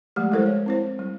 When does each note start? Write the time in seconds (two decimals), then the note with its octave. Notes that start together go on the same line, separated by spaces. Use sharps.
0.16 F3 G#3 A3 G4
0.31 G3 G#3 E4 A4 A#4 C5
0.46 C#5
0.66 C4 E4 C5
0.99 G3